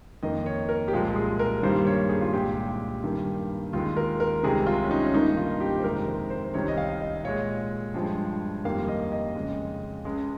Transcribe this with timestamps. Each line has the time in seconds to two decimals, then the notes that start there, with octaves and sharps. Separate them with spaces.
0.23 F2 D#3 A#3 D#5
0.46 C#5
0.69 A#4
0.88 G4
0.93 C2 A#2 F3 G#3 G#4
1.16 G#4
1.39 A#4
1.63 G2 D#3 G3 A#3 C5
1.87 C#5
2.09 G#4
2.21 F4
2.33 C2 A#2 G#3 G4
3.04 G2 D#3 G3 A#3
3.73 D#2 D#3 G#3 F4
3.97 A#4
4.20 A#4
4.43 C2 C3 D#3 G#3 G#4
4.67 F4
4.84 C#4
4.91 D#4
5.06 C#4
5.14 G2 D#3 A#3 D#4
5.37 F4
5.60 G4
5.79 C5
5.84 F2 C3 D#3 G#3 A#4
6.07 C5
6.30 C5
6.45 C5
6.54 C2 C3 D#3 C#5
6.68 D#5
6.77 F5
7.01 D#5
7.24 A#2 G#3 C#5
7.94 G2 F3 G#3
8.64 F2 D#3 G3 A#3 F5
8.88 D#5
9.12 D#5
9.35 F2 C#3 G#3
10.05 C#2 C#3 G#3